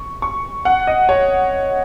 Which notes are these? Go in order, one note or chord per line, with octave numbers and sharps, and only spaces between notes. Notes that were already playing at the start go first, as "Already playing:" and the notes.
Already playing: C#6
C#6
F#5
D#5
C#5